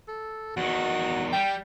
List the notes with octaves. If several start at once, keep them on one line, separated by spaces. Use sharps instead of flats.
A4
E2 D#3 F#4
G3 G5